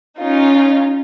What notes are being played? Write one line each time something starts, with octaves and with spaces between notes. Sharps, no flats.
C#4 D#4 F4